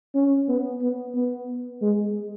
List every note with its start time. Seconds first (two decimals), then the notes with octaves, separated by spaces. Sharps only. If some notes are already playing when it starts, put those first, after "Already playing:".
0.15 C#4
0.48 B3
0.82 B3
1.15 B3
1.82 G#3